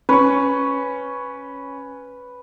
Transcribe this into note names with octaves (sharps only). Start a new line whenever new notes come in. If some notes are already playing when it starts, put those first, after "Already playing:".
C#4 B4 C#6